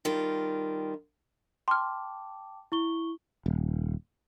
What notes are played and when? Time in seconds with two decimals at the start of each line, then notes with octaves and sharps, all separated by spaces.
0.05 D#3 G3 F4
1.68 G5 A5 C6 D6 F6
2.72 E4 C#6 G7
3.46 D#1